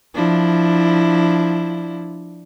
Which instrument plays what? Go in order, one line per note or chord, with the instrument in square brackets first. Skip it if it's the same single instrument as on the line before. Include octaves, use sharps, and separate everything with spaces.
[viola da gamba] F3 D4 E4